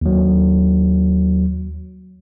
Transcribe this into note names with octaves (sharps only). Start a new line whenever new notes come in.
D#2 F#3